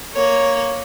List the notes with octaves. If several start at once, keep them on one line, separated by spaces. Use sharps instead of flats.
A#3 C#5